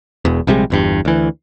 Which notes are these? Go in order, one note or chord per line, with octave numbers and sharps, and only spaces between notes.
E1 E2
A#1 C3 G3 G#3
G1 E2 G2
D2 E3